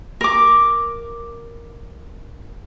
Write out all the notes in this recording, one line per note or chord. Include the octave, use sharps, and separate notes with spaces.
A#4 D6